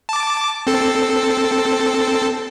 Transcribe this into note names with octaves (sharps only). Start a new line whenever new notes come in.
A5 D6
C4 A4